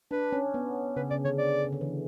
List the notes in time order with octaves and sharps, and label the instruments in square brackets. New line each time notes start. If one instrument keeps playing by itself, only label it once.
[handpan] D4 [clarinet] B4
[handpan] C#4
B3
[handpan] C#3 [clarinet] B4
[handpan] C#3 [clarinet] D5
[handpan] D3 [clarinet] C#5
[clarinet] D5
[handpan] C#3
D3
E3